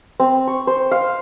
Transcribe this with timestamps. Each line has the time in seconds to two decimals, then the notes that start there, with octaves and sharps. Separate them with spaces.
0.19 C4
0.47 C#6
0.67 C5
0.91 F5